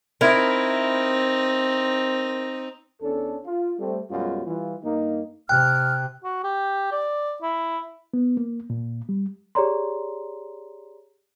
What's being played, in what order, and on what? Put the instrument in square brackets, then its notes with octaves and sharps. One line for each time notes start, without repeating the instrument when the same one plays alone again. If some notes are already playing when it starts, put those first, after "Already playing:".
[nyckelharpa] C4 D#4 [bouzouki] E4 A#4
[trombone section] E2 C#4 D4 A4
F4
G3 A3 C4
F#2 B2 G3 G#3 F4 F#4
E3 G3 F4
G2 A#3 D#4
[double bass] C3 [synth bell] G5 [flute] F6 [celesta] F#6
[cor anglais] F#4
G4
D5
E4
[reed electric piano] B3
A#3
A#2
G3
[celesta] G4 G#4 C#5 D5 A#5 C6